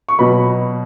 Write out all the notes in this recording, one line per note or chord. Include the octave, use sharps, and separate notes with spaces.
C#6
B2 F#3 B4 B5